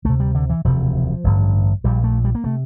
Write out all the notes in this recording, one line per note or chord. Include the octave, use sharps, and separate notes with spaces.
D2 C3 A3
G3
D3
E3
E1 D2 C3 F3
A1 G2 D3
A#1 A#2 G3
A3
G3
A#3
C3 A3